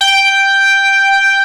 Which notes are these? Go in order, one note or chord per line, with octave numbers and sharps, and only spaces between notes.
G5